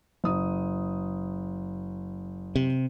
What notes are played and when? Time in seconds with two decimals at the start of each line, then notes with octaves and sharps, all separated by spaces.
0.24 F#1 D#6
2.56 C3